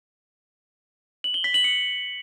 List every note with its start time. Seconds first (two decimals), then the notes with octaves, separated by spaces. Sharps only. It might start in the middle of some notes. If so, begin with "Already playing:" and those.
1.24 F#7
1.34 G7
1.44 B6
1.54 F#7
1.64 C#7